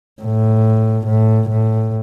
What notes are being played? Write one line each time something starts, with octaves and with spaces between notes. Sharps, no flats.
A2
A2
A2